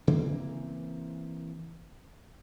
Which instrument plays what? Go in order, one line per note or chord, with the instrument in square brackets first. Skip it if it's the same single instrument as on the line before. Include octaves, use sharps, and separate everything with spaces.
[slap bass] C#3 E3 A#3 C4